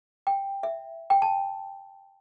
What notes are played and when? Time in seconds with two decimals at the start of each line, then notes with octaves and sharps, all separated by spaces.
0.27 G5
0.63 E5
1.10 G5
1.22 A5